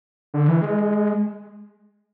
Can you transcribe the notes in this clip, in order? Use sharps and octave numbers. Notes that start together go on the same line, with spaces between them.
D3
E3
G#3